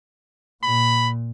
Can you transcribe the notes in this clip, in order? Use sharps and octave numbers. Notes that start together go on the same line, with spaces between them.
A#2 B5